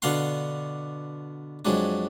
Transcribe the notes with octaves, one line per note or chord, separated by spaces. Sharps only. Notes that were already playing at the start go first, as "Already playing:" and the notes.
B2 D3 D4 F5 F#5 C6
F2 F#3 G#3 D4